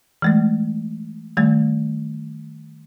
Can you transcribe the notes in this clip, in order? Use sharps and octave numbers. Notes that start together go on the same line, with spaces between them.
E3 G#3 A3
D#3 G3 A3